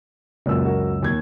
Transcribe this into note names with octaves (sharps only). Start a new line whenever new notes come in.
C#2 F#2 A#2 E6
F#4 A#4
D#2 G#6